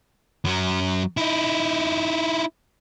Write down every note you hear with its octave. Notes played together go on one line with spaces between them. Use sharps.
F#2 F#3
D#4 E4